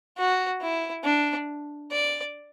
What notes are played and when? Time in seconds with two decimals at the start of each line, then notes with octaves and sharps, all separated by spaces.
0.18 F#4
0.61 E4
1.04 D4
1.91 D5